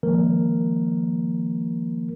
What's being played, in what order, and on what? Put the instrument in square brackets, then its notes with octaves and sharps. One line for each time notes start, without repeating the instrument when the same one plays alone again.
[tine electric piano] D#3 F3 G#3 A#3 A#4